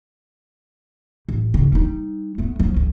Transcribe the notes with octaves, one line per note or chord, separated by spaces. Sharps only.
A1
G2 C#3
G3 D#4
A3 B3
F3 C#4
D2